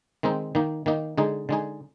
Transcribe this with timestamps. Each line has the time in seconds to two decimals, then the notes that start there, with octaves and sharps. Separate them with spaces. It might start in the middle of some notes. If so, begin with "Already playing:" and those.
0.23 D#3 G#3 C4 D#4
0.55 D#3 A#3 D#4
0.86 D#3 A#3 D#4
1.18 D3 G#3 D#4 G#4
1.49 D3 G#3 D#4 G#4